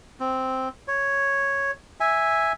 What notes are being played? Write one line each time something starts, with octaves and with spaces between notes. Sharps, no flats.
C4
C#5
E5 G#5